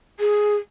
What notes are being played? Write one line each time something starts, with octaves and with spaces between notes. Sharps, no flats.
G#4